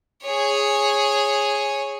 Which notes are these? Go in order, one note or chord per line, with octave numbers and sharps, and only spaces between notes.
G#4 C#5